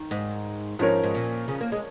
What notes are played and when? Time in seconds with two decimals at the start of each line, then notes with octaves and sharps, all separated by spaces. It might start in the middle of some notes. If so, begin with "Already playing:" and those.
Already playing: D#3
0.11 G#2
0.79 G#2 F3 C#4 A#4 C#5
1.03 G#2
1.14 A#2
1.48 C#3
1.60 A#3
1.72 G#3